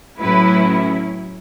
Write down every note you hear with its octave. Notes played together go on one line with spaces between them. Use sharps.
A2 F#3 C#4 E4 B4